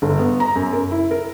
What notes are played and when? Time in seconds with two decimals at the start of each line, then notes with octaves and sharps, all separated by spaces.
0.02 G1
0.19 B3
0.40 A#5
0.56 F#2
0.73 A#4
0.91 E4
1.11 A#4